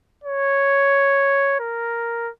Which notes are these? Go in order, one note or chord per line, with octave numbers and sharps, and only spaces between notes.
C#5
A#4